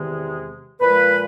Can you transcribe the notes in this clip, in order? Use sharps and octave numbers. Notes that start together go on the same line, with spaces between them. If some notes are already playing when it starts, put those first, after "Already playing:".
Already playing: E2 C3 D#3 G#3
A#2 F3 G#3 B4